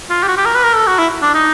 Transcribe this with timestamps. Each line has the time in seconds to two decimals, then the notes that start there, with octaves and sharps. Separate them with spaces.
0.10 F4
0.23 G4
0.28 F#4
0.37 G4
0.46 A#4
0.55 B4
0.63 A#4
0.75 A4
0.87 F#4
0.98 E4
1.22 D4
1.34 D#4